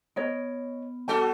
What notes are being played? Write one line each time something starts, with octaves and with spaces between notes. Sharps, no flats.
B3 C#5 D#5
G3 F#4 A4 A5